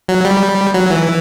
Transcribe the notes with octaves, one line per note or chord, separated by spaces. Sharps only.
F#3
G3
F#3
E3